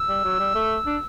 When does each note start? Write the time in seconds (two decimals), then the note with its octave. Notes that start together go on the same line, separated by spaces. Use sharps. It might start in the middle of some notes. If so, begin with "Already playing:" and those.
Already playing: E6
0.08 G3
0.24 F#3
0.40 G3
0.55 A3
0.86 D4